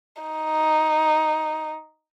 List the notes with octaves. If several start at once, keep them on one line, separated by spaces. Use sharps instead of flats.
D#4